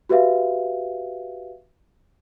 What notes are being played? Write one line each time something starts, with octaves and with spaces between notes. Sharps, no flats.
F#4 G4 B4 E5 F5